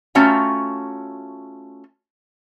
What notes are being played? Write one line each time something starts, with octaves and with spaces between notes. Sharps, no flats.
A3 C#4 F4 F#4 G5 A#5